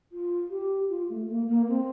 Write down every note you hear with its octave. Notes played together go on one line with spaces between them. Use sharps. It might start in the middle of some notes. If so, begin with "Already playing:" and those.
F4
G4
F4
A3
A#3
A#3
C4